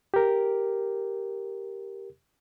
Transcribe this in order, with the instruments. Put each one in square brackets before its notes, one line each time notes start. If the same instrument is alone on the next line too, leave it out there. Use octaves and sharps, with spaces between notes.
[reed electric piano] G4 A#4